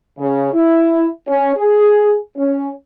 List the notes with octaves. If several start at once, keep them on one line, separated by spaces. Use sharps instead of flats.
C#3
E4
C#4
G#4
C#4